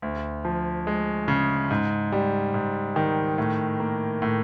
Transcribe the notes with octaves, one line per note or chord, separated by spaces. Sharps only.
D2
F3
G#3
C#3
G#2
G3
G#2
D#3
A2
A#3
A2